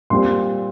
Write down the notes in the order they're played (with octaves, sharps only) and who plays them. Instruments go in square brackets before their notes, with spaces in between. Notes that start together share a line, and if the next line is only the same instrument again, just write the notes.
[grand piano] A#2 G3 C4 C6